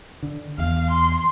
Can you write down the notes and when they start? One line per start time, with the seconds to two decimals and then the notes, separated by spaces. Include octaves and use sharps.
0.23 D3
0.58 E2 F5
0.91 C6